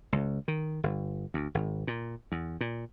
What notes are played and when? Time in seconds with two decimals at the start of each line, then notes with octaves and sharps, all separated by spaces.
0.12 C#2
0.48 D#3
0.83 G1
1.34 D2
1.55 G#1
1.87 A#2
2.32 E2
2.61 A#2